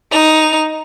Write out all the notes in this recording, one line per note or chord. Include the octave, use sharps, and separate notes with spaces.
D#4 F7